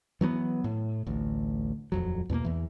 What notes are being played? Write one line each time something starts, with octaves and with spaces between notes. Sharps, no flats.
E3 F#3 A#3 B3
A2
A1 D2
D#1 F2 F#3
E2 B2 A3 A#3
E2 E3